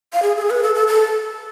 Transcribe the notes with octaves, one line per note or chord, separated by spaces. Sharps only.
F5
G#4
A4
G#4
B4
A4
A4
A4